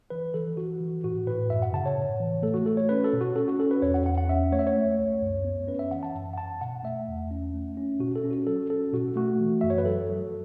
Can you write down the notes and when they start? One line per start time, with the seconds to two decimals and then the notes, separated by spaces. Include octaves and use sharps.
0.10 E3 B4
0.34 E3 A4
0.57 E3 F#4
0.81 E3
1.04 A2 F#4
1.26 A2 B4
1.50 F#2 E5
1.62 F#5
1.73 C#3 A5
1.86 C#5
1.97 A2
2.20 E3
2.42 A3 A4
2.54 F#4
2.66 A3 A4
2.77 C#5
2.89 C#4 B4
3.04 A4
3.13 B2
3.21 F#4
3.35 C#4 A4
3.48 F#4
3.59 C#4 A4
3.71 B4
3.82 E2 C#5
3.94 F#5
4.05 E2 F#5
4.18 F#5
4.28 C#4 E5
4.52 A3 C#5
4.59 E5
4.67 C#5
4.76 A3
4.99 C#2
5.22 F#2
5.45 B3
5.68 C#4 B4
5.79 E5
5.91 E3 F#5
6.03 A5
6.15 F#2
6.33 F#5
6.38 F#2 A5
6.61 B2 F#5
6.84 A3 E5
7.08 E2
7.31 C#4
7.54 A3
7.77 C#4
8.00 B2 F#4
8.16 A4
8.24 C#4
8.31 F#4
8.47 F#3 A4
8.70 C#4 A4
8.93 B2 F#4
9.16 A3 F#4
9.40 E3
9.61 F#2 E5
9.70 C#5
9.78 B4
9.85 F#3 A4
10.09 F#3